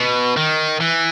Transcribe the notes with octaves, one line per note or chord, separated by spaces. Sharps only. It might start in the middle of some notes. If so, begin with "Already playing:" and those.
Already playing: B2
D#3
E3